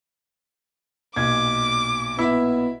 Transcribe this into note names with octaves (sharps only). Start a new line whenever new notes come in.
B1 A#2 D6 G#6
B3 E4 E5